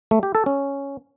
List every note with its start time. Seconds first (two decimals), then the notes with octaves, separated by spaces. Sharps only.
0.11 A3
0.23 G4
0.35 A4
0.46 C#4